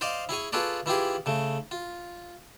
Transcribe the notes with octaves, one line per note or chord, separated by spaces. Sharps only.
C5 D5 D#5 F5
E4 G#4 C#5 G#5
F4 G#4 A4 B4 C#5 D5
E3 E4 F4 G4 G#4
C#3 A3
F4